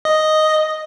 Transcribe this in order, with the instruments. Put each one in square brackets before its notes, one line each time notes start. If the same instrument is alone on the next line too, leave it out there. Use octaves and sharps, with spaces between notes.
[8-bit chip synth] D#5